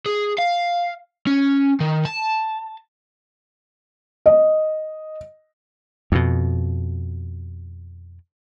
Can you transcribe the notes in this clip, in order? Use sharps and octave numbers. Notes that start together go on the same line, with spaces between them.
G#4
F5
C#4
D#3
A5
D#5
F2 B2